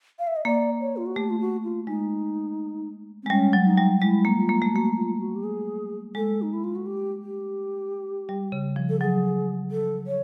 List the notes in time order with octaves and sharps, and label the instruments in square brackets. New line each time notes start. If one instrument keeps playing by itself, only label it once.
[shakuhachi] F5
E5
D#5
[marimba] A#3 [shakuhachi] D5
[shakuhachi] C#5
F4
F#4
[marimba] A3 [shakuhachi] G4
[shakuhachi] F4
F#4
F4
[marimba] G#3 [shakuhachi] D#4
[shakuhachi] C4
[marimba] G#3
[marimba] G3 [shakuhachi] C#4
[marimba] F#3
[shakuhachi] D#4
[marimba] G3
[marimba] G#3 [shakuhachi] E4
[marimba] A#3
[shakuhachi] F4
[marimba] A#3
A3
[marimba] A#3 [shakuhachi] F#4
[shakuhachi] F4
F#4
G4
G#4
[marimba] G#3 [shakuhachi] A4
[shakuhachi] D#4
E4
F4
F#4
G4
G4
[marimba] G3
C#3
F3
[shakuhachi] A4
[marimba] F#3 [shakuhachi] G#4
[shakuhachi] A4
C#5